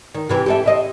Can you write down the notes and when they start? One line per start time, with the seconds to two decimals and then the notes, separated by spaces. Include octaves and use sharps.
0.15 D#3
0.29 C3 E3 G4
0.46 G4 A4 E5
0.66 C5 D#5 E5